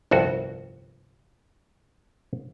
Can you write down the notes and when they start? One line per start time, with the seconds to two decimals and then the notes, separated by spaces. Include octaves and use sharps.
0.11 G1 C2 F2 F#4